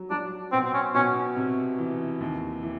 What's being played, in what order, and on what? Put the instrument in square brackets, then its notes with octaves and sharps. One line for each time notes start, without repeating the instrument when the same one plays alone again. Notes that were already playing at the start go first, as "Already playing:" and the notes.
Already playing: [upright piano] F#3
[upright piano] F#3 [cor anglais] D4
[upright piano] B2 [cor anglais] C4
[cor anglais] C4
C#4
[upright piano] B2 [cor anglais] C#4
[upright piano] C3
E3
D#2
E3